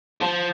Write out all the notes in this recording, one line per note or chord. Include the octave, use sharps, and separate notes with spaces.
F3